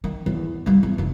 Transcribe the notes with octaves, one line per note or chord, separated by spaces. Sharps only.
D#3
E2
G3 A#3
E2
F1 D#3